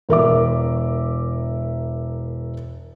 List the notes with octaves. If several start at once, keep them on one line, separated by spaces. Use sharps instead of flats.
E1 A#4 E5 D6